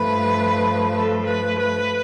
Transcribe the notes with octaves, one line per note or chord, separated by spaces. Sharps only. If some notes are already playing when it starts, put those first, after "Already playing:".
Already playing: G2 F3 A3 B4
A4
B4
B4